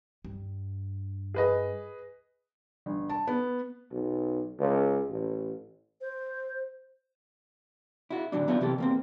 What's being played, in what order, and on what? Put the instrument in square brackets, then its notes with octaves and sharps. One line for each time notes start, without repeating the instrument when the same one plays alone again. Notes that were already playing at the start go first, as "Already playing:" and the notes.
[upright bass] G2
[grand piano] G#4 B4 D#5
[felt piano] G1
A5
B3
[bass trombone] B1
C#2
A1
[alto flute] C5
[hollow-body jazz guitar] E4 F#4
A2 D3 F#3 D4
F#3 B3 D4 E4 F4
C3 E3 G4 A4
E2 A#3 C4